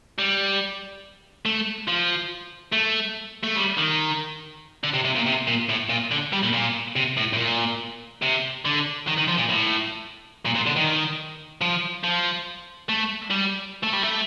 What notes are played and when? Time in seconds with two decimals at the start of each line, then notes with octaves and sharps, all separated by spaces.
0.19 G3
1.46 A3
1.88 F3
2.72 A3
3.44 A3
3.57 G3
3.78 D#3
4.84 D3
4.94 C3
5.05 C3
5.16 A#2
5.27 C3
5.47 A#2
5.69 A2
5.89 A#2
6.11 D3
6.33 G3
6.43 A#2
6.53 A#2
6.96 C3
7.17 A2
7.33 A2
7.37 A#2
8.22 C3
8.65 D3
9.08 D#3
9.18 D#3
9.28 F3
9.39 A#2
9.50 A2
10.45 A#2
10.55 A#2
10.66 D3
10.76 D#3
11.61 F3
12.04 F3
12.89 A3
13.30 G3
13.83 A3
13.93 G3
14.02 A3